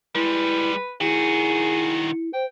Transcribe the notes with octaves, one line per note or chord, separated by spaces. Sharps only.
G3 G#3 E4 B4
D#3 E4 F#4 G#4
C5 G5